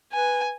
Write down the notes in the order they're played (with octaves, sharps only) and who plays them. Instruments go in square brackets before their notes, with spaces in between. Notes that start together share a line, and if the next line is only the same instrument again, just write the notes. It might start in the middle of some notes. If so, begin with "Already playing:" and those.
[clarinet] B4 [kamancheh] G#5